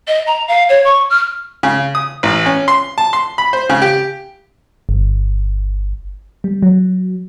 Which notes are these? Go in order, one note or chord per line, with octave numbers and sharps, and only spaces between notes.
D#5
A#5
F5
C#5
C#6
F6
C#3
D#6
A1
C#4
C6
A5
C6
B5
C5
C#3
G4
G1
G3
F#3